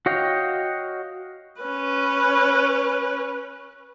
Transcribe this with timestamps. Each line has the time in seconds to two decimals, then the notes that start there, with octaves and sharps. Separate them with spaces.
0.06 F#4 C#5 D#5 F5 G5
1.61 C#4 B4